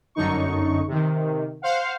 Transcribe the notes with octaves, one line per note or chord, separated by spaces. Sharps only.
G1 F#2 D3 D#4 C#6
C3 D#3
C5 F5 F#5